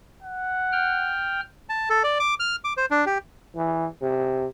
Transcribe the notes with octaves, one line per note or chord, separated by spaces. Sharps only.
F#5
G5 F6
A5
A4
D5
D6
F6
D6
C5
D4
G4
E3
C3